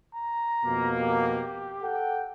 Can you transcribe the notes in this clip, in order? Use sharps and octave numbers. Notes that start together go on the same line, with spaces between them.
A#5
F2 B2 A#3
G4
A4 F#5 G5